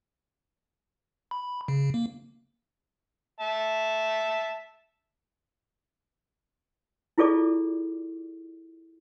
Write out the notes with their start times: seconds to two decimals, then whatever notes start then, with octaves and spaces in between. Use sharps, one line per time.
1.31 B5
1.68 C#3
1.94 A#3
3.41 E5 A5
7.18 E4 F4 G#4 A4 D5 D6